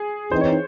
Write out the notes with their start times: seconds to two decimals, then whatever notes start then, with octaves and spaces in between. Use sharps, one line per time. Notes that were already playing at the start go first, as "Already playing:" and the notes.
Already playing: G#4
0.31 E3 C4 D#4 C5
0.41 C#5